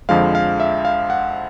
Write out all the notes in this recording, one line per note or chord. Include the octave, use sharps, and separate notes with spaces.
F2 D3 F3 G#3 F5
F5
E5
F5
F#5